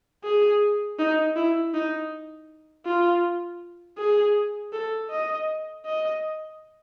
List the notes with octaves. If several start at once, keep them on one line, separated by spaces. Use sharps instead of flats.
G#4
D#4
E4
D#4
F4
G#4
A4
D#5
D#5